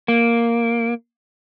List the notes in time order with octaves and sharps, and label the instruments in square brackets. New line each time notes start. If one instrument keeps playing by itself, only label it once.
[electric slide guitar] A#3